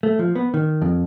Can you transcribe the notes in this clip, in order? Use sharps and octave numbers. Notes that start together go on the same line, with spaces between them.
A3
F3
B3
D#3
F2